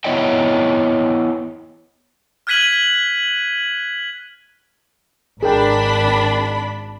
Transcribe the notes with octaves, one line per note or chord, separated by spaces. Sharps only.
B3 E4 C#5 D#5 E5 G5
F6 F#6 G#6 B6 D#7 F#7
G#1 D4 G#4 A#4 G5 B5